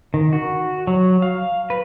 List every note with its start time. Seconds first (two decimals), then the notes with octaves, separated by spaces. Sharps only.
0.14 D#3
0.33 F#4
0.87 F#3
1.22 F5
1.70 B4